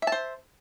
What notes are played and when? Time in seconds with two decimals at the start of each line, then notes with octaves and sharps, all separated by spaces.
0.02 E5
0.07 A5
0.12 C5